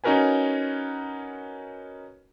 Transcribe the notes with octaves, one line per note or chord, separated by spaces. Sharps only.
C#4 D#4 F#4 A#4 B4 G#5